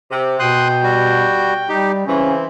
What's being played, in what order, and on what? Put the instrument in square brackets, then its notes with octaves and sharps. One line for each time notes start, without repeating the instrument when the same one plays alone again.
[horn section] C3
[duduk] B2 [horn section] G5 [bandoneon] C6 D#6 F#6
[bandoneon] G3 F#4
[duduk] G3 [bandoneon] D#4 G4
[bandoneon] C#3 [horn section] E3 C4 [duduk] C#4